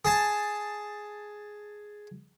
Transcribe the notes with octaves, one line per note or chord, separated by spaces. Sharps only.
G#4 A5